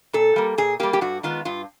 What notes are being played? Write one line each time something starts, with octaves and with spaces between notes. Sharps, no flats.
A#2 A4
G3 A#3
A#2 G#4
G3 A#3 G4
G4
G2 F#4
D#3 G#3 B3 F4
G2 F4